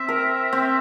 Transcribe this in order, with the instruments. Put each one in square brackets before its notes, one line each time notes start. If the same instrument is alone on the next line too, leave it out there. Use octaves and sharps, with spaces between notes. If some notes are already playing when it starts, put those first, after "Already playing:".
Already playing: [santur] C4 [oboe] E5
[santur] A#4
C4